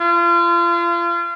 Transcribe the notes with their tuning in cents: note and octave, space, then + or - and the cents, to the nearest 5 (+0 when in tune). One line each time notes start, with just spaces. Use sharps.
F4 -35